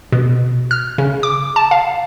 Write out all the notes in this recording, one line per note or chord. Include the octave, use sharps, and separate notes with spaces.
B2
F6
C#3
D6
A5
F5